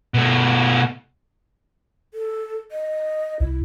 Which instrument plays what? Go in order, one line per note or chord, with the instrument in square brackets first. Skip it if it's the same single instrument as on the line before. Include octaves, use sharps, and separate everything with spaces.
[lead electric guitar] B2 A3
[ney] A4
D#5
[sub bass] C2 [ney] E4